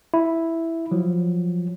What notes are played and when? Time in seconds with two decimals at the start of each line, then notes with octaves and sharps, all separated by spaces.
0.14 E4
0.91 F3 F#3